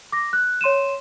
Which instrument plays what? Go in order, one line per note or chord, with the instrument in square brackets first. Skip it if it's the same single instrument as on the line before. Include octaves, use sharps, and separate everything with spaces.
[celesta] D6 A#6
F#6
C#5 C6 D#7 E7